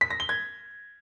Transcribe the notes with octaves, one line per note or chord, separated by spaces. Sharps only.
B6
A#6
G7
G#6